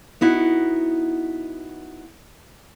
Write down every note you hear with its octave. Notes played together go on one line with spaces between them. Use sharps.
B3 D#4 E4 F#4